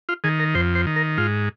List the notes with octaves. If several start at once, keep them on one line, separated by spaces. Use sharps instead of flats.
F4
D#3 G#4
A#4
F2 C5
C5
D#3
A#4
G#2 F4